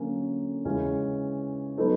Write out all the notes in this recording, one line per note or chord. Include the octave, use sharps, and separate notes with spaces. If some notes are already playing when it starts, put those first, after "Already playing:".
Already playing: D3 F#3 A#3 C#4
C#3 E3 G#3 C#4
F#3 B3 D#4 F#4 A4